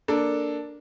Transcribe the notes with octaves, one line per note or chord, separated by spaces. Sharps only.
A#3 D4 A4